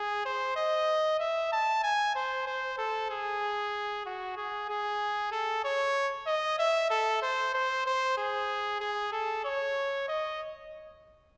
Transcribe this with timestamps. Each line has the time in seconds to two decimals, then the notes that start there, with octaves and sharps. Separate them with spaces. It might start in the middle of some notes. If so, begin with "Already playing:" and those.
Already playing: G#4
0.25 C5
0.56 D#5
1.19 E5
1.52 A5
1.83 G#5
2.15 C5
2.47 C5
2.78 A4
3.11 G#4
4.06 F#4
4.36 G#4
4.69 G#4
5.32 A4
5.64 C#5
6.27 D#5
6.59 E5
6.90 A4
7.22 C5
7.54 C5
7.86 C5
8.17 G#4
8.80 G#4
9.12 A4
9.45 C#5
10.08 D#5